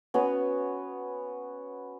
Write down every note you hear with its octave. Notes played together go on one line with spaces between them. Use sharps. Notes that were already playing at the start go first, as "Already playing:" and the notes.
B3 C#4 F#4 B4